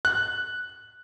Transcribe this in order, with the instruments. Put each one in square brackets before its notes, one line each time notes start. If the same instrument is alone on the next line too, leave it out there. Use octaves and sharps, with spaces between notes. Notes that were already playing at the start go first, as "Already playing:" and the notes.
[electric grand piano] F#6